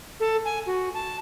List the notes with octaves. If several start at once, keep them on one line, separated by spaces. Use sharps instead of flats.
A4
G#5
F#4
A5